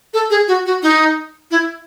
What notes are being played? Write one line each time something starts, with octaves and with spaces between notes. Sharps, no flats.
A4
G#4
F#4
F#4
D#4
E4